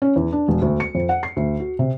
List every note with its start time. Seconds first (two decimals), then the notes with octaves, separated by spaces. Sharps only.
0.02 C#4
0.16 E2
0.32 D4
0.48 E1
0.62 D2
0.80 C#7
0.95 F2
1.09 F#5
1.23 C7
1.36 D2
1.60 F#4
1.79 C3